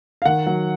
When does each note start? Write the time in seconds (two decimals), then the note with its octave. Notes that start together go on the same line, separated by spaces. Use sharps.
0.22 F5
0.25 D#3 F#5
0.46 F#3